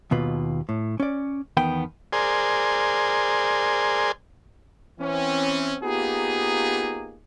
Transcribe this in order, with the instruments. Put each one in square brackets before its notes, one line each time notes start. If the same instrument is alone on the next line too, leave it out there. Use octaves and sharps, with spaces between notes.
[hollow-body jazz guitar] D#2 B2 F4 B4
A2
C#4 D5
E2 D#3 B3 G5 B5
[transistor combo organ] G#4 A#4 C5 D5 G#5 C6
[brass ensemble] E3 C4 C#4
A#3 B3 D#4 F4 G4 G#4